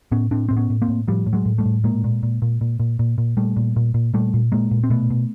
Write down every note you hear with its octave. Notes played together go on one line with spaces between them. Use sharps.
A2 B3 C#4
A2 C4 D4
A2 C4
B3 C#4
A2
A#3 C4
A2
A2 F3 G3
A2
F#3 G#3
A2
G3 A3
A2
A#2 G#3 A#3
A#2
A#2
A#2
A#2
A#2
A#2
A#2
A#2 G3 A3
A#2
A#2
A#2
A#2 G3 A3
A#2
A#2 G#3 A#3
A#2
C4
B2 A3 B3
B2